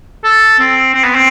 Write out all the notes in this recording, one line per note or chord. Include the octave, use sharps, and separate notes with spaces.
A4
C4
C4
B3
C4